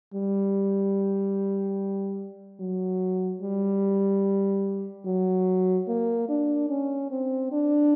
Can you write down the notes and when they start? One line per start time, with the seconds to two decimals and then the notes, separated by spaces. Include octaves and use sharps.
0.14 G3
2.60 F#3
3.42 G3
5.06 F#3
5.88 A#3
6.29 D4
6.69 C#4
7.10 C4
7.52 D4